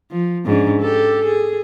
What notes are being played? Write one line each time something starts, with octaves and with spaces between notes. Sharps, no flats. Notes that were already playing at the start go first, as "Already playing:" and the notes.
F3
G#2 C#4 D4
G4 A4
G#4